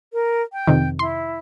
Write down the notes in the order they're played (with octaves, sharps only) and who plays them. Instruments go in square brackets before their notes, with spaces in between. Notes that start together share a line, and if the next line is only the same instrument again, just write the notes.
[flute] A#4
G5
[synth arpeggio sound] F2 C3 D#3
[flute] E4 [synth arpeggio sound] C6